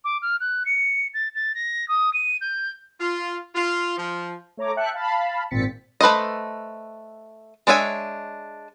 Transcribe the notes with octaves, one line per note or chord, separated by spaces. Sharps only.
D6
F6
F#6
C#7
A6
A6
A#6
D#6
D#7
G6
F4
F4
F3
A3 C#5 A#5 D6
E5 G5 A5 F#6 C#7
F5 A5 B5
G#1 A#2 C4 A6 B6 C#7
A3 B4 C5 D#5
G#3 D4 C#5 E5 G#5